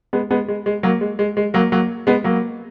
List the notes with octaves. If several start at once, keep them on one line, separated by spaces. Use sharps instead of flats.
G#3 B3
G#3 B3
G#3
G#3
F#3 A#3
G#3
G#3
G#3
F#3 A#3
F#3 A#3
G#3 B3
F#3 A#3